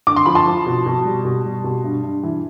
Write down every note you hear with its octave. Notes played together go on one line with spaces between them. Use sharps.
D3 D6
C6
F3 B5
A5 C6
F3
B2
B2
G3
B2
G3
B2
G2
G2
E3